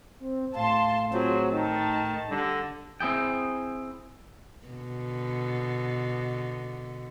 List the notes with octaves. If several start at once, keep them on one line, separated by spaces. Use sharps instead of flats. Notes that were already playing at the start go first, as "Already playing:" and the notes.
C4
A2 F5 A5 C6
F#3 C4 F4 G#4 C5
D#3 D#4 A5
D3 G3 A#6
C4 E4 G#4 G5
B2 D3